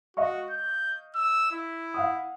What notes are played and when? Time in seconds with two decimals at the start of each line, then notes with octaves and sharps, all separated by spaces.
0.17 F#4 D#5 F5 C#6
0.50 G6
1.15 E6
1.52 E4
1.94 F5 F#5 D#6